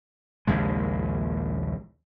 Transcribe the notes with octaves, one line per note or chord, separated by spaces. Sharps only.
A#1 D#2 C#3 G#3